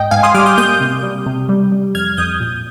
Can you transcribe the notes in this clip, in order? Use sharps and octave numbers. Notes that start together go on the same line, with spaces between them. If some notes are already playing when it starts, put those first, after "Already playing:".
Already playing: G#2 D#5 G5
G#2 F5 G#5
C6 D#6
G3 D6 F6
D#6 G6
A#3 D#6 G6
C3
G3
C3
G3
G3
F2 F6 G#6
F2 D#6 G6
A#2